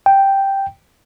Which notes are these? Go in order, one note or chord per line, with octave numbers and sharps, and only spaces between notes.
G5